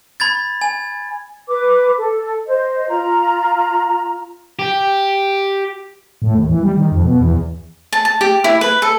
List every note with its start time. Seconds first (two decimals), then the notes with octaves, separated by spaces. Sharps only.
0.20 B5 G#6 A6
0.61 G#5
1.48 B4 D6
1.97 A4
2.48 C5 D#5
2.89 F4 A#5
4.59 G4
6.22 A2
6.35 D#2
6.49 E3
6.63 G3
6.77 D#3
6.92 F2
7.04 B2
7.20 E2
7.93 A5
8.05 A5
8.21 G4
8.44 E4
8.61 B4
8.82 A4